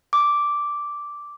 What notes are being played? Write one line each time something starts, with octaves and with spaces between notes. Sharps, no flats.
D6